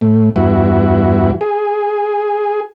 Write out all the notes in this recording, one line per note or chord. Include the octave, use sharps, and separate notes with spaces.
A2
E2 G2 E4 F#4
G#4